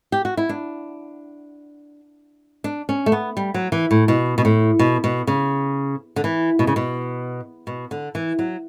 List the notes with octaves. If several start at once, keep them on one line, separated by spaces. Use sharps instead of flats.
G4
F#4
E4
D4
D4
C#4
A3
B3
G3
F#3
E3
A2
B2
B2
A2
B2
B2
C#3
D3
E3
B2
C#3
B2
B2
D3
E3
F#3